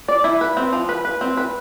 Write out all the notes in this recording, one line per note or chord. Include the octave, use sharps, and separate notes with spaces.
D5
E4
B4
C4
F3
B4
B4
C4
B4